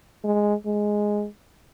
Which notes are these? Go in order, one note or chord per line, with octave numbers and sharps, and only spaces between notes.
G#3
G#3